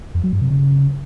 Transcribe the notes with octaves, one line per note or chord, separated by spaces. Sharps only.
F2
F#3
G2
C3
C#3